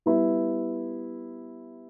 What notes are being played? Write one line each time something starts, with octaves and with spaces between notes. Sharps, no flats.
G3 B3 E4